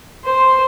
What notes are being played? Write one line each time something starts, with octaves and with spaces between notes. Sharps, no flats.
C5